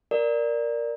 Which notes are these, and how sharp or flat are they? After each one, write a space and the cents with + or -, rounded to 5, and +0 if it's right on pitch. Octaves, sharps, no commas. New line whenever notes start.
A#4 +0 D5 +0